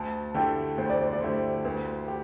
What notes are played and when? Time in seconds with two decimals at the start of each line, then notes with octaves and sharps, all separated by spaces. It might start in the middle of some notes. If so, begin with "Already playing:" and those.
Already playing: D2 A5
0.34 D3 A3 E4 G4 G5
0.78 D2 C5
0.90 D5
1.01 C5
1.13 D5
1.21 D3 A3 E4 G4 C5
1.65 D2 B4
2.08 G4